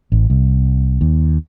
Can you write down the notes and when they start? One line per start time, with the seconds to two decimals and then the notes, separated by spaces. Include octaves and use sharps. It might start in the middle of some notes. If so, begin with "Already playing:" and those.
0.12 A1
0.30 C2
1.01 D#2